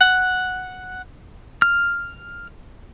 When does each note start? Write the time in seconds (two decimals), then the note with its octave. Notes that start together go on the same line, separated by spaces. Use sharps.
0.01 F#5
1.62 F6